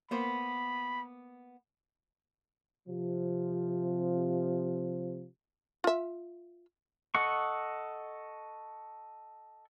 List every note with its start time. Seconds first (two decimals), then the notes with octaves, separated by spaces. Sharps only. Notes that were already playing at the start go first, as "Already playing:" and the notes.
0.11 A#3 B3 C5 B5
2.88 C3 F3
5.84 F4 E5
7.15 A4 D#5 F#5 C#6